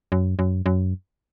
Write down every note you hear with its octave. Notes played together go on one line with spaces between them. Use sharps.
F#2
F#2
F#2